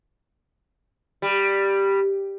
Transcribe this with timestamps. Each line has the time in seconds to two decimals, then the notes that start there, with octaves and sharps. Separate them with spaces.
1.22 G3